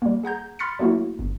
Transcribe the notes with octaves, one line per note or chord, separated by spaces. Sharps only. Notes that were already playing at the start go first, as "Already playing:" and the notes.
G3 A#3
G#4 F#5 A#5 G6
B5 C6 F6 A6 B6 C#7
F#3 A3 A#3 E4 F#4
G1